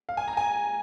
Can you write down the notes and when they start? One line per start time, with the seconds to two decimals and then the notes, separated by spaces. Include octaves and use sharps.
0.09 F5
0.17 G#5
0.28 A#5
0.37 G#5